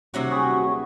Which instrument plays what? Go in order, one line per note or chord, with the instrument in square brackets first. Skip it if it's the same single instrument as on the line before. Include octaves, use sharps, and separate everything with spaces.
[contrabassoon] D#1 [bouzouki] C3 F#3 F#4
[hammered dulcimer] G4 G#4 B4 [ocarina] C#6